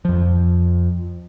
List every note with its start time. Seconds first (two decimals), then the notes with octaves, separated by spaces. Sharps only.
0.05 F2 F3